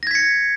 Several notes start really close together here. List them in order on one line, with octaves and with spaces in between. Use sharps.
A#6 G#6 B6 C#7